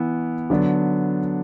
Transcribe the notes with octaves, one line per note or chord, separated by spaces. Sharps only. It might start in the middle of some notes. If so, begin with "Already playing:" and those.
Already playing: E3 B3 E4
D3 F#3 B3 D4